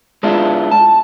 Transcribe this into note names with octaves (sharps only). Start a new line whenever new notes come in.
G#3 B3 D4 E4 F4
A5